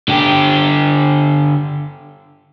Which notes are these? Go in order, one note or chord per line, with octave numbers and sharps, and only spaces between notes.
D3 G4